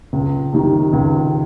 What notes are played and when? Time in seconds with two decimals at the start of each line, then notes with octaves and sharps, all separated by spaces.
0.13 C#2
0.53 C3 D#3
0.93 C#2